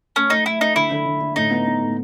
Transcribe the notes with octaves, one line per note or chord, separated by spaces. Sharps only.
A3 C#4
A3 D#4
A3 E4
A3 D#4
D3 E4
D3
D3
D3
A2 D#4
B3
B3
A2